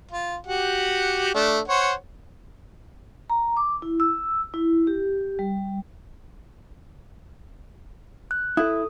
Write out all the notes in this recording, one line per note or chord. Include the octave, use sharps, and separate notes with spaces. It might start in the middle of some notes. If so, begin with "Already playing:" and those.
F4
F#4 G4 F#5
A3 D4
C5 C#5 F#5
A#5
D6
E4
E6
E4
G4
G3
F#6
E4 A4 D#6